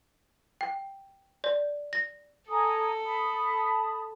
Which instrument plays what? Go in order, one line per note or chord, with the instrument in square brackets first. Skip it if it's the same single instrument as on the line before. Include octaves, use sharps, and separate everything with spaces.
[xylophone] G5
D5
A#6
[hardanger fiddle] A4 [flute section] G#5 A#5 D#6
[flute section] A5 B5 D#6